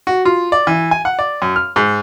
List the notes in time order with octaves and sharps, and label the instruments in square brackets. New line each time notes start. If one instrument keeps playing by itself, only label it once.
[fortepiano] F#4
F4
D5
E3
G#5
F#5
D5
F#2
F6
G#2